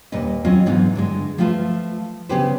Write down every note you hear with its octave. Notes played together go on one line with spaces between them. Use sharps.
D#2 A#2 G3 B4 D#5
F#3 C4 C#4 F4 D#5
G#2 C3 E3 B3 D#4
G2 D3 G#3
F3 A3 B3 F4 A4 B4
C#3 B3 C#4 G4 B4 C5